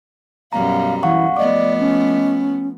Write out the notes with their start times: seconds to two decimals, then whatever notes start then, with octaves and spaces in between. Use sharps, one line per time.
0.53 F#2 B2 G3 F5 A#5
1.03 E3 F5 F#5 C#6
1.37 F3 A3 B3 D5 D#5 D6
1.80 C#4